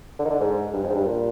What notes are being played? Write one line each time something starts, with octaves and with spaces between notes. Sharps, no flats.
D3
D#3
D3
G#2
G2
F2
G#2
G2
A#2